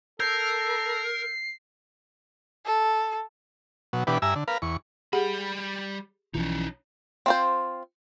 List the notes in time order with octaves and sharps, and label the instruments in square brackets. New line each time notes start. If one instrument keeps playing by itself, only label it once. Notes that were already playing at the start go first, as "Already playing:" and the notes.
[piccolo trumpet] A4 [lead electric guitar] A#4 [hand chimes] E6 G6 G#6 [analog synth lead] C7
[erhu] A4
[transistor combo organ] B2 F#3
B2 E3 D4 G4 B4
G2 E5 G#5 A#5 E6
D3
A#4 B4 F5
E2 C#6
[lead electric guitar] G3 B5 [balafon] G4 G#4 F#5
[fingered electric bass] B1 E3 F3 [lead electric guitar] C#4 D#4
[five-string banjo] C4 F4 C5